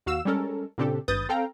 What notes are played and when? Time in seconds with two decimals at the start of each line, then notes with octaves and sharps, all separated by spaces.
0.06 D#2 F#4 F5 E6 E7
0.25 G3 G#3 C#4 A4 A#4
0.78 A#2 C#3 C4 D4 G4 A4
1.08 G#1 G2 B4 D#6 G6 A6
1.29 C4 A4 F5 G5 A#5